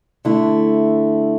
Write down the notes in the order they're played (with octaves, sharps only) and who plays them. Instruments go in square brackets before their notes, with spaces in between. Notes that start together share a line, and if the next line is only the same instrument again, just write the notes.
[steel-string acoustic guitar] D3 A3 E4